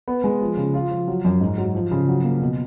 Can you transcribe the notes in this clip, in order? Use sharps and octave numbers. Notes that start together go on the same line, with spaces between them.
B3
G#3
F3
C#3
F4
F3
F#3
F#2
G#2
F#3
F3
C#3
F#3
A#3
B2